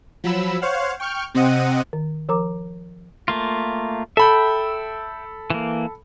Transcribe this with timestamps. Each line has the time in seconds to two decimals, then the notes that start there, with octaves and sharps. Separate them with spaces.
0.24 F3 F#3 B5 E6 E7
0.62 C5 C#5 F5 F#5
1.00 G5 C#6 F6 G6
1.35 C3 C4 D#5 F#5 D#7
1.93 D#3
2.29 F3 A#4 A#5 D6
3.28 A3 A#3 F4
4.17 A4 E5 G5 B5
5.50 E3 A#3